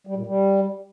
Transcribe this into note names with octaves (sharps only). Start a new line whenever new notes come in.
G3
A#2
G3